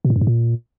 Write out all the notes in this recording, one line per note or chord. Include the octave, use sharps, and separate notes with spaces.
B2
A2
F#2
G#2
A#2